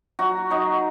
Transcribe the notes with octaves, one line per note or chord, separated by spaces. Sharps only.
F#3 F#4
F#3 D#4